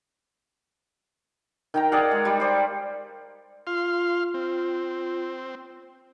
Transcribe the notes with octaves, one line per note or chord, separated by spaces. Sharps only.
D#3 G5 A#5
G#4 D5 F5 F#5
G#3
G3
C5 D5
F4 F5 C6
C4